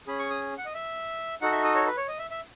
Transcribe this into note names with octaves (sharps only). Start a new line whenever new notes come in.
C#4 G#4 B5
C#6
D#6
F#5
D#5
E5
D#4 F#4 A4 F#5
E5
D#5
C#5
B4
C#5
D#5
E5
E5